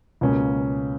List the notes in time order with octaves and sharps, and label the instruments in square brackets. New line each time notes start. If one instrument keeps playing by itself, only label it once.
[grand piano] C#2 B2 A#3 C#4